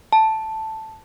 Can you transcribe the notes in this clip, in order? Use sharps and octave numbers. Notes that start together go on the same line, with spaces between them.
A5